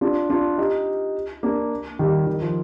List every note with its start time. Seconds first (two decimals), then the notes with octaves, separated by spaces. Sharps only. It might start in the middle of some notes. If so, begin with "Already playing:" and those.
0.01 D4 F4
0.30 D4 F4
0.58 D#4 G4
1.43 A#3 D4
1.99 D#3 G3
2.27 D#3
2.41 F3